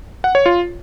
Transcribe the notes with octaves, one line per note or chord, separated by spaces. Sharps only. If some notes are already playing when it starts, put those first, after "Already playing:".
F#5
C#5
F4